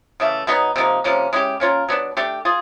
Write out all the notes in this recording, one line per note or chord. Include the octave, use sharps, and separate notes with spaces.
C#3 E3 A3
B2 F#3 B3 D#4
C3 F3 A#3 D#4
C3 F3 A#3 C#4
G#3 C#4 E4 G4
A#3 C#4 F4 A#4
F#3 B3 D4
A3 D4 G4
F4 G#4